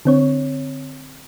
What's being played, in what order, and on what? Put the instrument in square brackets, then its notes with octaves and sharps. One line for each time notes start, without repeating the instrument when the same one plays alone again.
[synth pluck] D3 C4 C#5